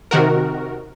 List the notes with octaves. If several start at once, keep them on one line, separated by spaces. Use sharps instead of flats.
C3 D#3 F#4 A#4